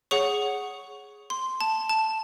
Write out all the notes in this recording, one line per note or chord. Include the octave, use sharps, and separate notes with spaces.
G#4 C#5 F#5 C#6
C6
A5
A5